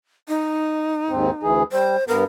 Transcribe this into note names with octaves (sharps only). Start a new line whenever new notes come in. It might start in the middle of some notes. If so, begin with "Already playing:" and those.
D#4
D#2 G#2 C4
D2 E3 G#4
G3 C5
G2 B3 A#4